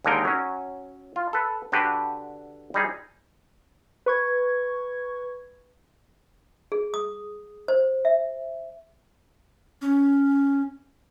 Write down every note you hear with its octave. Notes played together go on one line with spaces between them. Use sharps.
D#2 D3 G#3 D#4 A#4 G5
F#3 C#4
F4
A4 B4
D3 D4 F#4 G4 B4
G3 D#4 G#4
B4 C#6 G#6
G#4
D#6
C5
E5
C#4